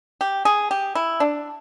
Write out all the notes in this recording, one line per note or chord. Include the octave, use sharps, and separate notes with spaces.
G4
G#4
G4
E4
D4